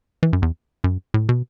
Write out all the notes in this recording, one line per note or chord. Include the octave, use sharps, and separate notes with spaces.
E3
F#2
E2
F#2
A2
B2